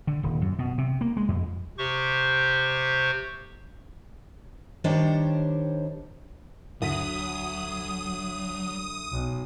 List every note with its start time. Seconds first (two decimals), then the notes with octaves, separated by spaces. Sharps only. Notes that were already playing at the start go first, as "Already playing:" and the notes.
0.07 D3
0.23 D#1
0.42 F#2
0.59 B2
0.78 C3
1.01 A#3
1.17 G#3
1.28 F2
1.78 C3 G4 C5 C#6
4.84 D#3 G3 D4 G4 C5 C#5
6.82 D2 F#3 D#6 B6
9.12 B1